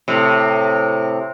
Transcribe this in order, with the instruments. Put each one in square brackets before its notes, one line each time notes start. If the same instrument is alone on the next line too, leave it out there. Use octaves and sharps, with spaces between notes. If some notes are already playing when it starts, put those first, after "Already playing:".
[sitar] A2 C3